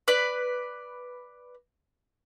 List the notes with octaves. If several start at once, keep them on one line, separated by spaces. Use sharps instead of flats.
B4 D5